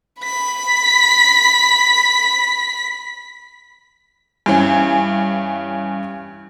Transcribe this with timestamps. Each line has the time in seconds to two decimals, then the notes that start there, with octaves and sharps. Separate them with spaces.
0.22 B5 B6
4.46 G2 E3 C#4